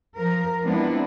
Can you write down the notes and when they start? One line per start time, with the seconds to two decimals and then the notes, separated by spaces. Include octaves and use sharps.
0.18 F3 A#4
0.64 F3 G#3 B3 C4 D4 E4